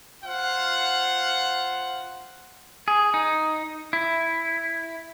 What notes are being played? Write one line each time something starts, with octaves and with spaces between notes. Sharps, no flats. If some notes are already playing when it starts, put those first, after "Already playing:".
F4 C5 F5 F#5
G#4
D#4
E4